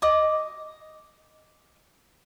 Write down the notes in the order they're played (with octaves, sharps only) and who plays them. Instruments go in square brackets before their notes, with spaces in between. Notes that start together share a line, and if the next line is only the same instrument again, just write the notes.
[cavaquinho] D#5 D6 D#6